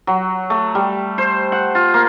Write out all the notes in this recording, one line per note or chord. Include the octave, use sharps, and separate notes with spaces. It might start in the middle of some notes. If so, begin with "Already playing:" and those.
F#3
A3
G3
C5
F#5
F4
A#3